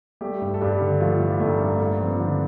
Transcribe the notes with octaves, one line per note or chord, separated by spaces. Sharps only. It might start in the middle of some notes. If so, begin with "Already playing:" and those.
G3 A3 G4
G2
A4
G2 G3 G4
D3
F3 A3 F4
A1
G2 A3 A4
A#3 A#4
G2
A3 A#3
F3 C4
D3 F3 D4